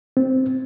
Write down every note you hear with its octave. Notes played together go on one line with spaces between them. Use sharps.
C4